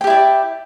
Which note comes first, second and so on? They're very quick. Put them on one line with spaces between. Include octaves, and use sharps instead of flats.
G5 G4 E4 D5